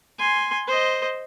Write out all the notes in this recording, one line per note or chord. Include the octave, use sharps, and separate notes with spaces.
G#5 C6
C5 D#5